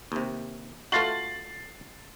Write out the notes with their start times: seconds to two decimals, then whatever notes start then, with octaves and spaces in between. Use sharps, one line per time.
0.12 D#2 C3
0.92 A3 F4 F#4 A6 C7 F#7